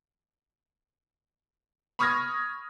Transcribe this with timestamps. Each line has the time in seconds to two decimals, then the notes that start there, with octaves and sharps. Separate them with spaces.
1.99 B5 C#6 D#6 F6 G#6 A#6